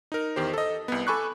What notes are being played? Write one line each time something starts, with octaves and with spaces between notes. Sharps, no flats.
D#4 A#4
E2 D#3 G4 C5
A4 D#5
C2 B3
A4 G#5 B5 C#6 D6 F#6